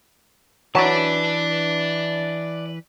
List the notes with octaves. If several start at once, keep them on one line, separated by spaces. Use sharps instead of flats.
E3 F#3 B4 D5 A5